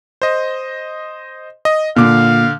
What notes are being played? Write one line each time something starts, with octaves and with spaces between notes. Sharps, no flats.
C5 D#5
D#5
A#2 D3 F5 D6